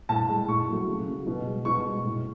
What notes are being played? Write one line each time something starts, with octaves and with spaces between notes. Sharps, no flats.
A2 A5
G#3
A2 C#6
F#3 A3
C#3
F#3 A3
B2
G#3
B2 C#6
G#3
A2